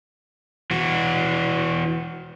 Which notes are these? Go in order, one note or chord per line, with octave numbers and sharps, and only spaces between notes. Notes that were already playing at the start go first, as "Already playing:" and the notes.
E3 F#4